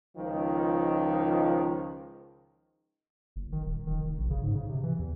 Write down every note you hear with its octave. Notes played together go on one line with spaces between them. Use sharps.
C#2 D#3 F3
F#1
D#3
D#1
D#3
F1
A#1
C#3
G#2
C#3
C3
E3
E2